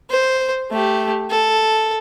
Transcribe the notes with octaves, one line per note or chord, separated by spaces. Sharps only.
C5
A3 G4
A4